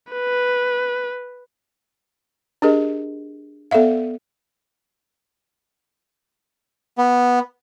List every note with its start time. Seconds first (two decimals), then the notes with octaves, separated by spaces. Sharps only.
0.12 B4
2.62 D4 G4 G#4 A#4 D#5
3.71 B3 A4 D5 E5 F5
6.98 B3